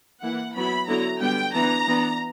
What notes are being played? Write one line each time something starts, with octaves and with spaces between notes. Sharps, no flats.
E3 A#3 E4 F#5
F#3 B3 E4 B5
D3 F#3 B3 E4 A#5
D3 G3 B3 G5
E3 B3 D4 A#5
E3 B3 D4